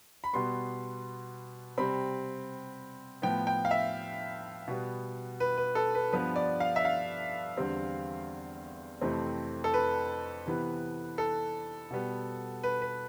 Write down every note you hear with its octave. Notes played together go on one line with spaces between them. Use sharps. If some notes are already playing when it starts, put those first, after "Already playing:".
B5
B2 G3 B3 C6
C3 G3 C4 B5
A2 F3 B3 G5
G5
F5
E5
B2 G3 B3
B4
B4
A4
B4
G2 F3 B3 B4
D5
F5
E5
F5
E2 D3 G3 C4
F2 C3 E3 A3 C4
A4
B4
C3 E3 B3
A4
B2 G3 B3
B4
B4